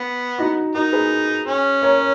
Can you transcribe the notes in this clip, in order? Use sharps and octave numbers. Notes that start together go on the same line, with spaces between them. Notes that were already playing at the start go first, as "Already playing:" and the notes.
Already playing: B3
D#4 F#4
D#4 F#4 A#4
G#4 B4
C#4
A#4 C#5